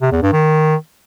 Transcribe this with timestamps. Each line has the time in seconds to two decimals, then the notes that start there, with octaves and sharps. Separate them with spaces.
0.02 C3
0.12 E2
0.22 G2
0.33 D#3